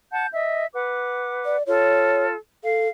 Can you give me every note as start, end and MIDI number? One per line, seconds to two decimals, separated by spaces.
0.12 0.26 78
0.12 0.26 81
0.12 0.26 91
0.33 0.65 75
0.33 0.65 76
0.74 1.57 71
0.74 1.57 78
0.74 1.57 86
1.45 1.63 74
1.66 2.36 65
1.66 2.36 69
1.66 2.26 73
2.64 2.88 69
2.64 2.89 77